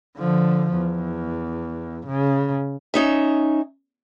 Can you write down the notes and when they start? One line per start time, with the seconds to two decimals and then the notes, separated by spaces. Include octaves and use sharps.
0.18 D3 F3
0.75 E2
2.06 C#3
2.94 C#4 D#4 E5